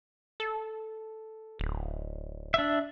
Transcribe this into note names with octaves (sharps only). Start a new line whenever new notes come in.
A4
D1
D4 E5